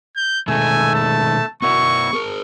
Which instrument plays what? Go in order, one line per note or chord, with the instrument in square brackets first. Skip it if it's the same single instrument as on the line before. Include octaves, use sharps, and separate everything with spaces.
[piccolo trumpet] G6
[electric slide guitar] B2 D#3 G#3 [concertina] A3 E6 [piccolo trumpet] G#5
[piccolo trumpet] A5
[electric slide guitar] B3 A#4 D5 [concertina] E4 F#4 [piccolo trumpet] C#6
[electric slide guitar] G#4 A#4